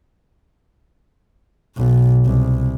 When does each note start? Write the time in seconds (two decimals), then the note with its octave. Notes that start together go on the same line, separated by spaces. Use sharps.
1.77 B1
2.26 C2